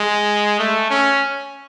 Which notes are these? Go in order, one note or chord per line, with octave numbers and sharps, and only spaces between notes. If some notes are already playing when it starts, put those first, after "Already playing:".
Already playing: G#3
A3
C#4